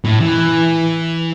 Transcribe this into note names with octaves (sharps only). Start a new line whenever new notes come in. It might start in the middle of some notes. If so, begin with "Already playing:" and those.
A2
E3